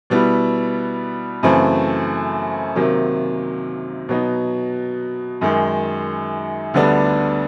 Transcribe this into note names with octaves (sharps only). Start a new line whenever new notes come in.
B2 G3 B3 E4
F#2 C#3 E3 A3 C4
C3 D#3 F#3 A#3
B2 F#3 B3 D#4
F#2 D#3 G#3
D2 D3 G3 B3 D4